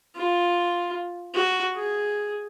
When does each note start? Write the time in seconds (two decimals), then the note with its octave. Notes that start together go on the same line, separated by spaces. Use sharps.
0.16 F4
1.34 F#4
1.75 G#4